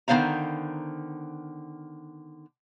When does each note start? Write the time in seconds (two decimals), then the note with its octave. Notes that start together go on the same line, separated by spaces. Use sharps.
0.08 D3 D#3 B3 C5 F5 A#5